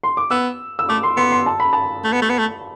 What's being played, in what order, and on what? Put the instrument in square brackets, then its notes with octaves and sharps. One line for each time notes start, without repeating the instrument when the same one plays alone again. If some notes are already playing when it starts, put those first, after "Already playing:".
[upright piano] C6
D6
[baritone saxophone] B3 [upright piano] E6
[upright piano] E6
[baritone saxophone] A3 [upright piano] D6
[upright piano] C6
[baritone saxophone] B3 [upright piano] C6
[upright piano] C6
A5
B5
A5
[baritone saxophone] A3
B3
A3
B3
A3